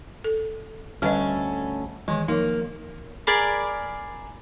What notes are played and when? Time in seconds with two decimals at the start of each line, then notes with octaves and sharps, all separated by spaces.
0.24 A4
1.02 D2 G3 C#4 A4 B4 D#5
2.08 D#3 E3 G#3
2.28 F3 A#3 D#4
3.27 G#4 A#4 D5 B5